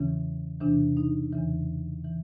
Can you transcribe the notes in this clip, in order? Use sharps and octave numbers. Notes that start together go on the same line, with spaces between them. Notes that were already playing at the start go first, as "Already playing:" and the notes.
Already playing: E2 C#3 E3 C#4
E2 C3 E3 D4
D#4
E2 C#3 E3
E3